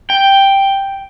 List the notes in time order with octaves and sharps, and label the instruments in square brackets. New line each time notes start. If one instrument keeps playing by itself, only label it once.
[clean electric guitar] G5